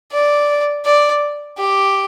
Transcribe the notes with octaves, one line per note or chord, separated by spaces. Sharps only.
D5
D5
G4